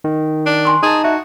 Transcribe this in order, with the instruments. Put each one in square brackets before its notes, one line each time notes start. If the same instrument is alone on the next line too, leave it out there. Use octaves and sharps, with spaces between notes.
[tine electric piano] D#3
[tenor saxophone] D4
[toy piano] G#5 C6 C#6
[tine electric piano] D#4 A5 [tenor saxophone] G#4
[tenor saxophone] F#4 [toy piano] E5